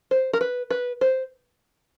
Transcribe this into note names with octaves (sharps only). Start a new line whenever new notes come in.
C5
A#4
B4
B4
C5